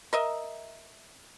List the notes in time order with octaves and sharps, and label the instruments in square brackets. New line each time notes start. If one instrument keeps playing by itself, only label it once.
[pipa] A#4 D#5 E5